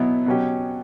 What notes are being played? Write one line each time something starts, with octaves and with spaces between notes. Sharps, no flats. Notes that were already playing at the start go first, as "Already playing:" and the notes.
Already playing: B2 F#3 B3 E4
B2 F#3 C#4 G4